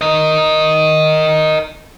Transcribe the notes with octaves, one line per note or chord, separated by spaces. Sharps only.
A#4 D#5